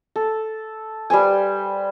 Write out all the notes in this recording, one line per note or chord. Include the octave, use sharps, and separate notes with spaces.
A4
G3 B4 C5 G#5